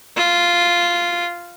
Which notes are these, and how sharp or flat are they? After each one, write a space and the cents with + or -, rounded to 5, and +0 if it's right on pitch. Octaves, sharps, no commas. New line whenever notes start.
F4 -5